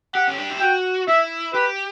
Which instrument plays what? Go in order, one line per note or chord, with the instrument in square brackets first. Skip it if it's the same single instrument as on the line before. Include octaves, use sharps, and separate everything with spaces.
[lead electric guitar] G4 [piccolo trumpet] F#5
[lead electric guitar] C#4
D4
E4
[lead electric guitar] F#4 [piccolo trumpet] G5
[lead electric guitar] E4 [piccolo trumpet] E5
[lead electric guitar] G4 [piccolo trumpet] B4